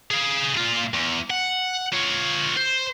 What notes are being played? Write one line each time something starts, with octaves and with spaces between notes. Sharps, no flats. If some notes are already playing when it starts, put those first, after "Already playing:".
G#4 F5
A#2 F4
E2
F#5
F4 C#5
C5